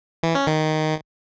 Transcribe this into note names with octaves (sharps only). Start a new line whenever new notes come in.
E3
C#4
D#3